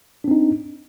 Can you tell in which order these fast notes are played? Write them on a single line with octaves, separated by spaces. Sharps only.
D4 C4 D#4